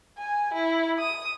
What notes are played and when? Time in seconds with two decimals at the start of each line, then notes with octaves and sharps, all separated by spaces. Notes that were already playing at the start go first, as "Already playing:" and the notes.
0.18 G#5
0.54 E4
0.99 D#6